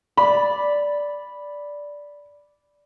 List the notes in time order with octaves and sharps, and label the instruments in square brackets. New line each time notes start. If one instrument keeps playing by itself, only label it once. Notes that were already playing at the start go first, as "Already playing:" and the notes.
[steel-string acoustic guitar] D5 [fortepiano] B5